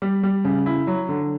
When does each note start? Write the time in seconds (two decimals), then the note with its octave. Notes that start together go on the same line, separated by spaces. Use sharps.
0.02 G3
0.23 G3
0.45 C#3
0.66 E4
0.87 F#3
1.09 D3